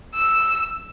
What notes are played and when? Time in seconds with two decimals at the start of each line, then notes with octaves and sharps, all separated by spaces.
0.15 E6